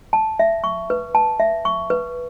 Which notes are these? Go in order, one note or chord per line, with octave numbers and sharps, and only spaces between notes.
A5
E5
C#6
B4
A5
E5
C#6
B4